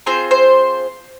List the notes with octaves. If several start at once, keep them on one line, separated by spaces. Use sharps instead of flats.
C4 F4 G#4 C5
C5